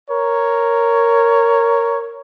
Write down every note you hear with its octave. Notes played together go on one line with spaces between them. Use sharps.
A#4 C#5